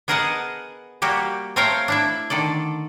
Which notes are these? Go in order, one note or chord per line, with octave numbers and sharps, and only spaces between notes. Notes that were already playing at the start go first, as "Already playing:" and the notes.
B3 G#4 A#4 D#5 F#5 A5
G3 A#3 F#4 G4
A3 C4 A#4 C#5 F5 G5
D4 E4 E5
D3 D#3 A4 D5